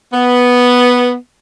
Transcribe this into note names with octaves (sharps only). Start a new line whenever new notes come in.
B3